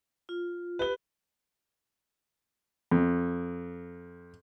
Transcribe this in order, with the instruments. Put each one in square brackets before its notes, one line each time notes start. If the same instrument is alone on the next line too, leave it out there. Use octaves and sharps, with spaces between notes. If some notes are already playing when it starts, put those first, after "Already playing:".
[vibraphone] F4
[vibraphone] G4 [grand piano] B4 G7
[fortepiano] F2